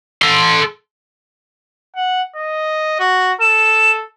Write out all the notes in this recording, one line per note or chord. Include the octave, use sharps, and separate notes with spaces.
A4 C6
F#5
D#5
F#4
A4 E7